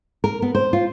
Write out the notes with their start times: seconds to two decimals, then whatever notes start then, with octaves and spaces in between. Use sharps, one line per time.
0.24 A#4
0.42 B3
0.55 C5
0.73 F4